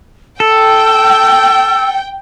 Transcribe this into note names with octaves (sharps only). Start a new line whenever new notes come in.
A4 G5 E6